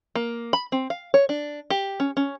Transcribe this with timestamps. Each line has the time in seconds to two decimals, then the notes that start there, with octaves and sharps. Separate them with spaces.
0.15 A#3
0.53 B5
0.72 C4
0.90 F5
1.14 C#5
1.29 D4
1.70 G4
2.00 C#4
2.17 C#4